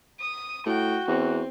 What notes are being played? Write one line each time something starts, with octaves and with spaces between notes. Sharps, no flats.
D#6
A2 F#4 G5
E2 C4